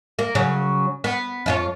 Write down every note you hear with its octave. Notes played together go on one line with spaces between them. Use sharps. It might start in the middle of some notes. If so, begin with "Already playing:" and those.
A#3
C#3 F#3
B3
F2 F4 C#5